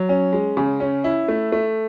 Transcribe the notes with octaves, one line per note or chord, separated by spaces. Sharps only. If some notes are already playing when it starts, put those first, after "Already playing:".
Already playing: F#3
C#4
G#3
C#3
C#4
E4
A3
A3